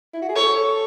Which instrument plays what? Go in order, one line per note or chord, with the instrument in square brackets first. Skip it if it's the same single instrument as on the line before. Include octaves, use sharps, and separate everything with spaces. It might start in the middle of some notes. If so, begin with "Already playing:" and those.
[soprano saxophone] E4
F#4
G#4
[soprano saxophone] A4 [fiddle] C#5